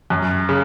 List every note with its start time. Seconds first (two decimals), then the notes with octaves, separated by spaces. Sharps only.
0.10 F#2
0.49 C#3